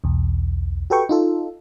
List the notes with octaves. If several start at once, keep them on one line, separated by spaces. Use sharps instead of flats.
B1 E2
F#4 G4 A4 B4 G5 C#6
D#4 F4 A4